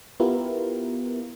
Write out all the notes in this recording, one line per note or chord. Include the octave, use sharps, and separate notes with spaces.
B3 E4 F4 G4 A#4